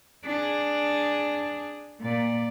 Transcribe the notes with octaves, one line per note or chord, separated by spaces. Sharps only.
D4 G#4
A#2 D5